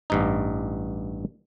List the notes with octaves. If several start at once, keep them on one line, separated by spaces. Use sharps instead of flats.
A1 G2 D#4